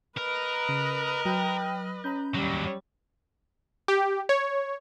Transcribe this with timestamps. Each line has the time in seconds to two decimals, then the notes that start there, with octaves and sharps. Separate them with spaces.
0.17 A#4 B4 D#5
0.69 C#3
1.25 F#3 G5 F6
2.04 C#4 A#5 B5 G6
2.35 D#2 F#3 G3 C#6
3.88 G4
4.29 C#5